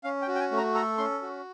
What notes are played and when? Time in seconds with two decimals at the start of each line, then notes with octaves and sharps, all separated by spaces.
0.04 C#4 F5
0.22 G5
0.28 F#4
0.35 G5
0.40 G#5
0.51 A3
0.57 A#5
0.74 A4 A#5
0.98 C#4 C6
1.22 F#4